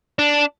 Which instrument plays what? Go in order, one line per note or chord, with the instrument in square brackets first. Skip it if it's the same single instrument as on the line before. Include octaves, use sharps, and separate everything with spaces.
[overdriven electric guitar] D4